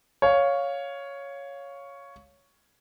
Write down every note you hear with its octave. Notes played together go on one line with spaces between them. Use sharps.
C#5 F5